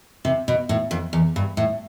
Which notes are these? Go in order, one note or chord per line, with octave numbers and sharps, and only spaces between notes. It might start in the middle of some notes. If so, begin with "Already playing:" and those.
C3
B2
A2
F2
E2
G2
A2